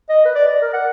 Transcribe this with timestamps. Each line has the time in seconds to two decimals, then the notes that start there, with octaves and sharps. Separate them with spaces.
0.09 D#5
0.25 B4
0.35 D5
0.48 D5
0.62 A#4
0.73 F#5